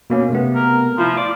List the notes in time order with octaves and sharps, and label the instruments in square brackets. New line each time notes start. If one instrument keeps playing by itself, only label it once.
[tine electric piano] B2 A#3 C#4
C3 A3 B3
[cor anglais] A#4
[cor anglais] F3 [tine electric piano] E4 F4
[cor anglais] D5 [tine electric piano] D6